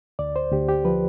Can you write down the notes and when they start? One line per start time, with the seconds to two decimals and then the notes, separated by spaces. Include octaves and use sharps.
0.19 D2 D5
0.36 C5
0.52 D2 G4
0.69 G4
0.85 F3 B4